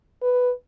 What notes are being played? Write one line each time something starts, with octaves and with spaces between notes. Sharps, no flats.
B4